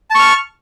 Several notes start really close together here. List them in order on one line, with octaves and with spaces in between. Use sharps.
A5 C#6 F6